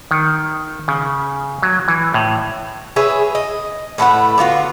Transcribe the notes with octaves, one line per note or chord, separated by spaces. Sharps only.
D#3
C#3
F#3
E3
A2
G#4 B4 C#5 E5
D#5
A2 A3 B4 F#5
D3 B3 F4 F#4